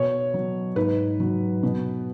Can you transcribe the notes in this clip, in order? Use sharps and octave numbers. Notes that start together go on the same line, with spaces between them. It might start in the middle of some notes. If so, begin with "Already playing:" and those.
Already playing: B2 C#5
F#3
G#2 B4
F#3
B2